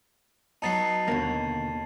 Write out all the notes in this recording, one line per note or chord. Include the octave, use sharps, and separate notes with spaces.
F#3 B3 D#4 A5 A6 C7
D#2 B2 D3 A#3